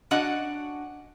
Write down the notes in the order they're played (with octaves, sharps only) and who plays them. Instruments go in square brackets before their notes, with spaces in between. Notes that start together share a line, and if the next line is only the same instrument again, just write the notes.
[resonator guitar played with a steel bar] C#4 D4 F#4 D#5 F#5